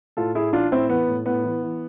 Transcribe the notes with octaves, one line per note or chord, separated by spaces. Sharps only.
A2 F4 A4
A2 E4 G#4
E3 D4 F4
A2 C4 E4
E3 B3
A2
A2 B3
E3
E3